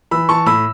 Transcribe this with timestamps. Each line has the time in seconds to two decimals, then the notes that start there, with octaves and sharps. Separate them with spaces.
0.11 E3 B5 E6
0.29 E3 A5 C#6
0.46 A2 B5 E6